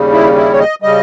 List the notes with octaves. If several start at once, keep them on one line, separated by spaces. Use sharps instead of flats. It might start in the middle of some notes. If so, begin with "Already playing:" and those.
Already playing: D#2 C#3 G3
E4
E4
C#5
D#5
C#3 G3 D#5